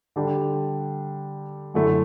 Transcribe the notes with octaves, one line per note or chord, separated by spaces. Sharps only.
D3 G3 D4 G4
F#2 D3 A3 E4